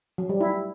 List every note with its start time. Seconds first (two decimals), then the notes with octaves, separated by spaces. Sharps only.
0.18 F#3
0.29 G3
0.41 E4